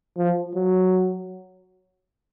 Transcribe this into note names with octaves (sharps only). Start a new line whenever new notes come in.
F3
F#3